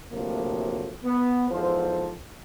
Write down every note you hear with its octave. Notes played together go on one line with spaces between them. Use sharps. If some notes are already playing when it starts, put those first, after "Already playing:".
D2 A2 C3 F3 F#3 A#3
B3
E2 G#2 F3 A4 C5